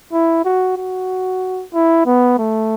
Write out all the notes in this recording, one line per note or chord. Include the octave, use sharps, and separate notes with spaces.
E4
F#4
F#4
E4
B3
A3